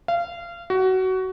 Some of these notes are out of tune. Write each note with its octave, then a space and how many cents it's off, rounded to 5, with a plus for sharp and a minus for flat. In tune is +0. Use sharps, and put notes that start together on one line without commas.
F5 -25
F#4 +20